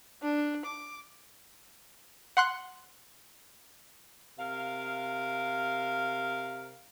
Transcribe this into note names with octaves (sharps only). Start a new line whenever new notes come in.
D4
D6
F#5 C6 F#6
C3 A#4 F5